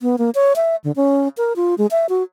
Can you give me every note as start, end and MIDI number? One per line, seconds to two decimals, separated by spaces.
0.01 0.16 59
0.18 0.30 58
0.35 0.53 73
0.56 0.76 76
0.84 0.92 50
0.96 1.28 61
1.37 1.53 70
1.56 1.75 65
1.78 1.86 56
1.91 2.06 76
2.09 2.23 66